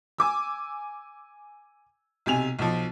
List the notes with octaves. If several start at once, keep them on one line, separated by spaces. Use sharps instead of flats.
G#5 D6 E6
B1 C3 G#5 F7
B1 F3